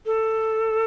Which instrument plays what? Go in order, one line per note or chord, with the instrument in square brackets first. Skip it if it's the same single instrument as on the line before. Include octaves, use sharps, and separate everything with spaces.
[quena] A4